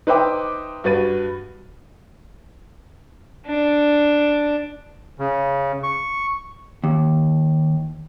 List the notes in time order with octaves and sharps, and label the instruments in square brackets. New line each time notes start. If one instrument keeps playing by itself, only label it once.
[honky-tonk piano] D#4 B4 C5 E5 G5 D6
G2 F#4 B4 A6 D#7
[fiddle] D4
[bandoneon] C#3
C#6
[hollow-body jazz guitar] D#2